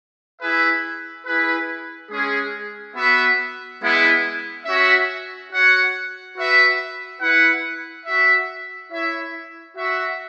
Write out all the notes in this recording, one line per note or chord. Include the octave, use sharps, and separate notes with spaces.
E4 G#4 B4 E5
E4 G#4 B4
G#3 C#4 G#4
B3 F#4 B4 E5
G#3 B3 E4
C#4 F#4 E5
F#4 C#5 F#5
F#4 B4 E5
E4 B4 F#5
F#4 E5
E4 C#5 E5
F#4 E5